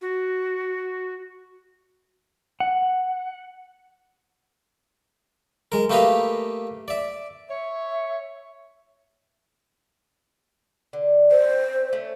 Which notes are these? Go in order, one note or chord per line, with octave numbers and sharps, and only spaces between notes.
F#4
F#5
G#3 A#4
A3 A#3 G4 B4 D#5 F5
D5 E5
C#5 E5
D3
C#4 C5
A3 C#4